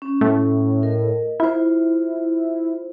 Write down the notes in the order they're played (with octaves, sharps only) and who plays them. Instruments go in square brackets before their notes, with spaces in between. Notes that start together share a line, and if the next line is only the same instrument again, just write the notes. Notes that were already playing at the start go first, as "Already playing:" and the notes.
[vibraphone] C#4
[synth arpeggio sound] A2
[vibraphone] A#4 D#5
[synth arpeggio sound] E4 [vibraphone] F4 C5